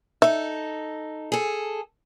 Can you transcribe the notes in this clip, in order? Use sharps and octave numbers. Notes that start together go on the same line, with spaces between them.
D#4 A4 E5
G#4 A4